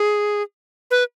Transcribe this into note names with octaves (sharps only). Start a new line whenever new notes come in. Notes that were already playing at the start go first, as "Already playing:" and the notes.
Already playing: G#4
B4